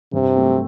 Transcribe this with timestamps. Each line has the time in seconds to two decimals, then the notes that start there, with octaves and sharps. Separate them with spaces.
0.13 G2 C3
0.35 F#3 A3 C4